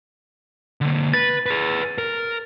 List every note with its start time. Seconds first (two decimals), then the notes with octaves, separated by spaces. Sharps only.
0.81 D3 A#3
1.14 B4 A6
1.46 G#4 B4
1.98 A#4